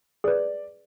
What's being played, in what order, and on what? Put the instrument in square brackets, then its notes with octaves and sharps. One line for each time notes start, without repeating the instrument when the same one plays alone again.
[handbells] G#4 B4 [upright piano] D5